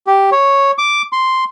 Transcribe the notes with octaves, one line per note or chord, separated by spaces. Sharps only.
G4
C#5
D6
C6